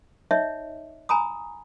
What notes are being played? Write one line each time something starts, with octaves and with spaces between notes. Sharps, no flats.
D#4 C#5 D#5 E5
G#5 A#5 B5 D#6